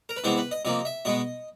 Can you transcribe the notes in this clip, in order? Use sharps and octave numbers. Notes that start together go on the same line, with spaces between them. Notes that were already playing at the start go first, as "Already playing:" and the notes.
A#4
B4
C3 E3 G#3 B3 C5
B4
D#5
C3 F3 A#3 D#5
E5
B2 G#3 B3 D#5